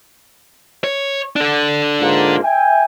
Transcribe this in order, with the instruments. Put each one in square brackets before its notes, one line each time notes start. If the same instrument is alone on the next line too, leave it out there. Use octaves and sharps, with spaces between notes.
[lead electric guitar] C#5
D4 A4
[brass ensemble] G#2 A#3 F4
E5 G5 G#5